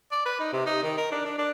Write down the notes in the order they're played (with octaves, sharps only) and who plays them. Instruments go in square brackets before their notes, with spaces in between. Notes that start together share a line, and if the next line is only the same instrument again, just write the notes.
[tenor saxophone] D5
B4
D#4
C3
D#4
D#3
A#4
D4
D4
D4